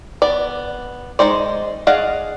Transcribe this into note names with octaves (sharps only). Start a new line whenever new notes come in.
B3 D5
G#3 D#4 C5 D5
G#4 D5 D#5 F5 F#5